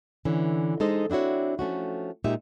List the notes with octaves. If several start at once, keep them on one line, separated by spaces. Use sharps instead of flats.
D3 E3 C#4
G#3 D#4 A4 C5 D#5
C4 D4 E4 F#4 C#5
F3 A3 C#4 F#4
A#2 G#3 D#4 G4 E5